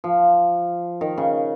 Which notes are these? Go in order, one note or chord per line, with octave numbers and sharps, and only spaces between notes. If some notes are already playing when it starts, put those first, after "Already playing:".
F3
D#3
C#3